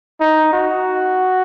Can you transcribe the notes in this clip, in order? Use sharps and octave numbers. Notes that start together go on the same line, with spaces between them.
D#4
F#4